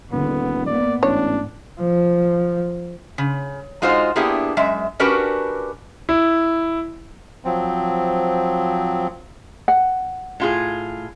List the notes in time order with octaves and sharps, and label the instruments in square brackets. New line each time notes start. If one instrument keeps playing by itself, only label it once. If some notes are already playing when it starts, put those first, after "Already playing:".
[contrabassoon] D#1 [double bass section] D3 [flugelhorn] B3
[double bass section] A#3 B3 [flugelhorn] D5
[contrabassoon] A1 [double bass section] G#2 [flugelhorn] D4 [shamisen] C#5
[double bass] F3
[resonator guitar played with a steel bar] C#3
G#3 D#4 F4 F#4 C5
A#3 B3 D4 E4 G4 G#4
F#2 G#3 E5
C#4 D4 F#4 G4 A#4 B4
[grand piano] E4
[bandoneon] F3 F#3 C4
[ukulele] F#5
[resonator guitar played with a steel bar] A2 F4 G#4